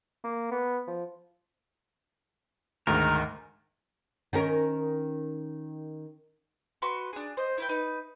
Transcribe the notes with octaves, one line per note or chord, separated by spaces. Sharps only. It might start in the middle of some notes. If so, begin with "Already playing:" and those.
A#3
B3
F3
D2 G#2 D#3 A#4
D#3 C#4 A#4
F#4 B4 C6 C#6
D4 G#4
C5 D#5
E4 B4 G5
D#4 B4